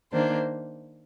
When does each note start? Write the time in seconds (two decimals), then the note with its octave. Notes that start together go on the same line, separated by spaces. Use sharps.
0.12 D#3 A#3 D4 C5